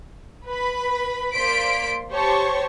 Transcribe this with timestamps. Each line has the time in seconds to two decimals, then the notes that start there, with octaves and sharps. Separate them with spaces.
0.46 B4 B5
1.33 A#3 C5 D5 C6 B6 D7
2.11 G4 C5 C#5 A5 C#6